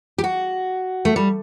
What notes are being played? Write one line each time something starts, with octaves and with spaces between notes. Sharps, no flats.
G4
F#4
A3
G3